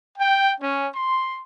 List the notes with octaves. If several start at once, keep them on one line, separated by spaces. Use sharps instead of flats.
G5
C#4
C6